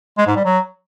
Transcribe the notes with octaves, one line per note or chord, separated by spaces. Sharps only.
G#3
G#2
G3
F#3